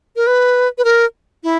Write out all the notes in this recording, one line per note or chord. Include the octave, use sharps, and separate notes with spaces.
A#4
B4
B4
A#4
E4